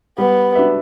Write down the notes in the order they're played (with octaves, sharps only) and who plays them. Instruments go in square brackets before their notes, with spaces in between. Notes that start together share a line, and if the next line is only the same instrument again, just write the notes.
[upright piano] G3 [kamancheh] B3
[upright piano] D4 F#4 B4 E5